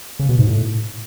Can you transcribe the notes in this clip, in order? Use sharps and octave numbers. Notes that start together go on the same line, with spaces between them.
C#3
B2
G#2
A2